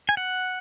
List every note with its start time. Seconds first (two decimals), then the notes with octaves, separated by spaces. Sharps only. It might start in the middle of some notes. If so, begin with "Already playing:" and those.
0.09 G#5
0.17 F#5